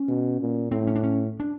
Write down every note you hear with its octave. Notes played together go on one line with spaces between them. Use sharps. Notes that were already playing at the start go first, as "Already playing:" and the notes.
Already playing: C#4
B2
A#2
A2 C4
C#4
D4
C#4
D4